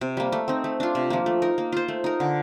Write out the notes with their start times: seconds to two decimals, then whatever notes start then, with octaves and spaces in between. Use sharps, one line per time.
0.01 C3
0.17 G3 A#3
0.32 A3
0.48 C4 D#4
0.64 A3
0.80 D4 F4
0.95 C3
1.10 F3 A#3
1.26 A3
1.42 D#4 A#4
1.58 A#3
1.73 F4 C5
1.88 A3
2.04 D#4 A#4
2.20 D3